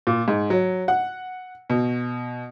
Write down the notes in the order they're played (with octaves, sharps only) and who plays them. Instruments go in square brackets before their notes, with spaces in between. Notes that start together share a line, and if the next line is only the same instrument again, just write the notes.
[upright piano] A#2
G#2
F#3
F#5
B2